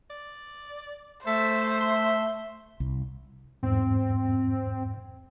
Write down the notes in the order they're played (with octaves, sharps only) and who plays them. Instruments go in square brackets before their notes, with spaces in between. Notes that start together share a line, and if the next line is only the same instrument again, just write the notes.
[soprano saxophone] D5
[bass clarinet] A3 [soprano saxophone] A4 [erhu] C5 [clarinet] E5
[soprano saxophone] C6
[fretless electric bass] C2
[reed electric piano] E2 G#2 [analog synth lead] C4